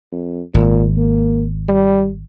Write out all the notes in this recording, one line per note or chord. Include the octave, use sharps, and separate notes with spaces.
F2
G#1 A#2
A#3
G3